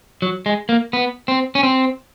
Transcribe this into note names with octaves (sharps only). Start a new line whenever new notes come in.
F#3
G#3
A#3
B3
C4
C#4
C4